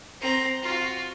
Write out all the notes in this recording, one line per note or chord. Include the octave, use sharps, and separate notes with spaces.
C4 A#5
F4 F#4